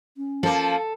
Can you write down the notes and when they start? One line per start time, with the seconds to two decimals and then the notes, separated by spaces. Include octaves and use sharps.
0.17 C#4
0.43 F3 A#3 A4